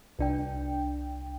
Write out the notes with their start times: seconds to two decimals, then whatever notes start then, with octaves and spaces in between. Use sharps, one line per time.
0.19 C2 D4 G5